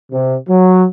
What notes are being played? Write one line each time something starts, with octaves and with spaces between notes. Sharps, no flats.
C3
F#3